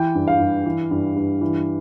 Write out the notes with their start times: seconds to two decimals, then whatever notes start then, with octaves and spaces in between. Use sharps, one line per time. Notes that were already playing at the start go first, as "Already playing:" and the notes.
Already playing: E3 G5
0.15 G2
0.28 F5
0.40 G2
0.65 E3
0.91 G2
1.16 G2
1.41 E3